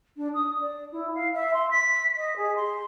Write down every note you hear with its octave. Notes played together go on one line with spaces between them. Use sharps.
D4
D#6
D5
E4
F5
E5
C6
B6
D#5
G#4
C6